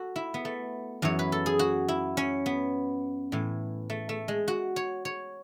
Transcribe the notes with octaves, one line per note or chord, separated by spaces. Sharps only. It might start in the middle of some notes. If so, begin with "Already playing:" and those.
Already playing: F#4 A4
E4
B3
A3
F#2 E3 C#5
B4
A4
G#4
F#4
E4
C#4
B3
A2 E3
A3
A3
G#3
F#4
C#5
C#5